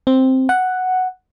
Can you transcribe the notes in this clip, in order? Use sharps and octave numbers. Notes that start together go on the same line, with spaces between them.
C4
F#5